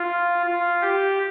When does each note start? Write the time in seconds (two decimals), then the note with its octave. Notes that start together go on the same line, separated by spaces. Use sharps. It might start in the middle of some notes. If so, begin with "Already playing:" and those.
Already playing: F4
0.46 F4
0.81 G4